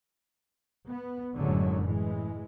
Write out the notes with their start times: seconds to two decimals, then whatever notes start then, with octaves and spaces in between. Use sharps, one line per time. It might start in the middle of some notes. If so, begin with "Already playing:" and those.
0.87 B3
1.36 F#1 F#2 A2 D3 F#3 G#3
1.82 A2 E3 G#3